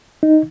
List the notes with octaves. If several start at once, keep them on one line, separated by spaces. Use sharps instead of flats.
D#4